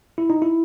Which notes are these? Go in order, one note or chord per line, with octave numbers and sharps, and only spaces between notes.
E4
D#4
E4